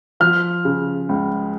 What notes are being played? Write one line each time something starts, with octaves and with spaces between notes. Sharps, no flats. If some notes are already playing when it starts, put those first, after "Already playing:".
F3 F6
C#3
C#2